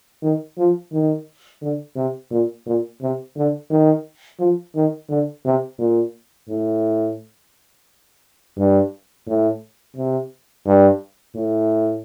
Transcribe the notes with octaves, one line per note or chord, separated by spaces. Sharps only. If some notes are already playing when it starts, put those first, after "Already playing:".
D#3
F3
D#3
D3
C3
A#2
A#2
C3
D3
D#3
F3
D#3
D3
C3
A#2
A2
G2
A2
C3
G2
A2